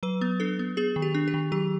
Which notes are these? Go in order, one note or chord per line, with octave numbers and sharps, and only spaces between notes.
F#3 B4
B3
D4 A4
B3
B3 G#4
D#3
G4
D4
G4
D#3
F#3 G4